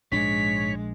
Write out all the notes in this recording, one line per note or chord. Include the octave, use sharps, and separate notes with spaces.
A#1 G#2 G#3 D4 C#5 B6